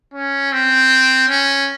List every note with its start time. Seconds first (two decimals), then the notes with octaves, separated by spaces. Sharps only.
0.14 C#4
0.52 C4
1.29 C#4